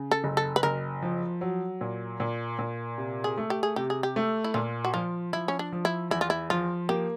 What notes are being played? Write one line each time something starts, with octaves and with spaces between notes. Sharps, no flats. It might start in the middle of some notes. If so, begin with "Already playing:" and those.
Already playing: C#3
A4
F#1
A4
B4
F#1 A#4
F3
F#3
A#2
A#2
A#2
C3
G#4
A3
G4
G#4
C3 G4
G#4
G4
A3
E4
A#2 F4
F#4
F3 F4
F3 E4
C#4
D4
F3
E4
E2 E4
F4
E4
F3 F4
A#3 G4